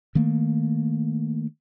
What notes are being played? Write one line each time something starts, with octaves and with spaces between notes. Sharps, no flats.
D#3 A3 A#3